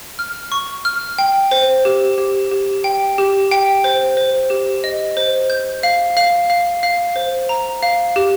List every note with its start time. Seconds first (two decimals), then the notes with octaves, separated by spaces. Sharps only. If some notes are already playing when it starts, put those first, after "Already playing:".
0.19 F6
0.52 C#6
0.85 F6
1.18 G5
1.51 C5
1.85 G4
2.18 G4
2.51 G4
2.84 G5
3.18 G4
3.51 G5
3.84 C5
4.17 C5
4.50 G4
4.84 D#5
5.17 C5
5.50 G6
5.83 F5
6.17 F5
6.50 F5
6.83 F5
7.16 C5
7.49 A#5
7.83 F5
8.16 G4